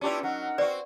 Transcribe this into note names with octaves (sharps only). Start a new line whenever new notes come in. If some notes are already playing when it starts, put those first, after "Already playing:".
B3 C#4 D4 E4 F4 G4
F#3 D#4 A#4 F#5
C4 F#4 B4 D5